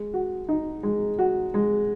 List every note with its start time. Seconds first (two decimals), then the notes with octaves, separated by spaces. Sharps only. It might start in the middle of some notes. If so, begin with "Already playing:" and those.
Already playing: G#3
0.14 F#4
0.49 D#4
0.83 G#3
1.19 F#4
1.54 G#3